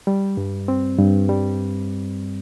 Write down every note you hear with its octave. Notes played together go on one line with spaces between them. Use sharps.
G3
G2
C4
G2
G3